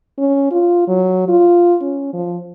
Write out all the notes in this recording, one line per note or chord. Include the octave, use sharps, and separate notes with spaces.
C#4
F4
F#3
F4
C#4
F3